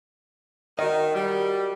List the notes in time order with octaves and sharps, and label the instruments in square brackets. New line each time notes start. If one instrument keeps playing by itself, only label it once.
[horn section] D#3 [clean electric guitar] F#4 A#4 D#5
[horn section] G3